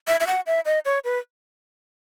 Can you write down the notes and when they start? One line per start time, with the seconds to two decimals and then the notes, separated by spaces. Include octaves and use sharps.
0.08 E5
0.20 E5
0.27 F#5
0.47 E5
0.66 D#5
0.85 C#5
1.05 B4